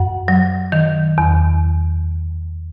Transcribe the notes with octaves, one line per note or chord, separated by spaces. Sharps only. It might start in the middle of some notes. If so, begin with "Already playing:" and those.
Already playing: F#2 F#5
F#3
D#3
E2